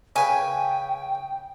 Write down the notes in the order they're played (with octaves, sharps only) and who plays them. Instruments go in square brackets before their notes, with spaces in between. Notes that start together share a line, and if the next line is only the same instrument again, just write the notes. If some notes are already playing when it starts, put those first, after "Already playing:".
[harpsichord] C#3 B4 [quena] G5 [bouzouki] G#5